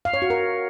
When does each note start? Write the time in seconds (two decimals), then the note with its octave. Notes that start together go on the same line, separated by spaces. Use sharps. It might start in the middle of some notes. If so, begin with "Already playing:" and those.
0.05 F5
0.14 C#5
0.22 F#4
0.30 A#4